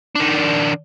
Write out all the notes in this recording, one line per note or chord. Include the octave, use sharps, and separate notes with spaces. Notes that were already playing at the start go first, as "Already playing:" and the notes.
D#3 D4